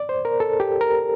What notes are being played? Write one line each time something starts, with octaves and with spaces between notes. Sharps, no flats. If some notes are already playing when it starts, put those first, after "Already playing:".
Already playing: D5
C5
A#4
A4
G4
A#4